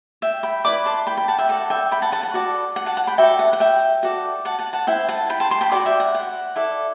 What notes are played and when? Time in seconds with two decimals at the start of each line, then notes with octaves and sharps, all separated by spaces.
0.22 E5 G5
0.43 G5 B5
0.65 E4 B4 D5 B5 D6
0.86 A5 C6
1.07 G5 B5
1.17 G5 B5
1.28 F#5 A5
1.38 E5 G5
1.49 F#4 A4 D5 F#5
1.70 E5 G5
1.91 G5 B5
2.02 F#5 A5
2.12 F#5 A5
2.23 F#5
2.34 F#4 A4 D5
2.76 F#5
2.86 F#5 A5
2.97 F#5 A5
3.07 G5 B5
3.18 F#4 A4 D5 E5 G5
3.39 F#5
3.53 F#5
3.60 E5 G5
4.03 F#4 A4 D5
4.45 F#5 A5
4.59 F#5 A5
4.73 F#5 A5
4.87 E4 A4 C5 E5 G5
5.09 F#5 A5
5.30 G5 B5
5.40 A5 C6
5.51 A5 C6
5.61 G5 B5
5.72 F#4 A4 D5 F#5
5.86 E5 G5
6.00 F#5
6.14 F#5
6.56 E4 A4 D5